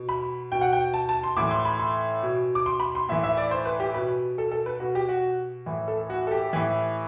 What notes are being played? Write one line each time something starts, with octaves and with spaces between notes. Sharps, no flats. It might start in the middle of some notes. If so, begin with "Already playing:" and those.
Already playing: B2
B5
B2 G5
F#5
G5
A5
A5
C6
A2 E3 D6
C6
B5
C6
B2
D6
C6
B5
C6
A2 E3 E5
E5
D5
C5
B4
G4
B2 B4
A4
A4
B4
B2 F#4
G4
F#4
A2 E3
A4
F#4
A4
G4
A2 E3